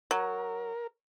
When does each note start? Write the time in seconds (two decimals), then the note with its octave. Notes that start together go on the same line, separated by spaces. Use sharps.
0.11 F#3 A#4